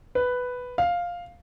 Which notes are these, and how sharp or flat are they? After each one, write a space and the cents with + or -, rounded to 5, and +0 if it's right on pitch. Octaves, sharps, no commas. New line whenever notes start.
B4 +5
F5 +5